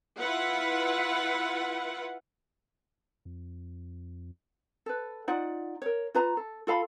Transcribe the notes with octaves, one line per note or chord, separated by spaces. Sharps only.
E4 F4 B4 F#5
F2
A4 B4
D#4 F4 D5 F#5
A#4 C#5
F4 B4 A#5
A4
F4 A4 F5 B5